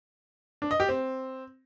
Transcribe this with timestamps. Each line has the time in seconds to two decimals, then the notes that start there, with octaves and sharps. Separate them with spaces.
0.62 D4
0.71 D#5
0.80 G4
0.89 C4